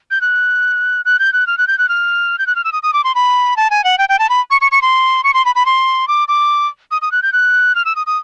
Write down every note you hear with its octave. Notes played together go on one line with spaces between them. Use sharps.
G6
F#6
F#6
G6
F#6
F6
F#6
G6
F#6
F6
G6
F#6
F6
E6
D#6
D#6
D6
C6
B5
A5
G#5
F#5
G5
G5
A5
B5
C#6
C#6
C#6
C6
C#6
C6
B5
B5
C6
D6
D6
D#6
D#6
F#6
G6
F#6
F6
E6
D#6
D#6